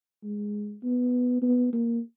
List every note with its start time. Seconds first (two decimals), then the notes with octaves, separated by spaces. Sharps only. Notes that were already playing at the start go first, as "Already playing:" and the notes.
0.23 G#3
0.84 B3
1.42 B3
1.73 A#3